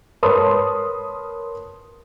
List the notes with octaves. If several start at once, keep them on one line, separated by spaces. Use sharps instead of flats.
A#4 B4 C#5 A5 C6 D#6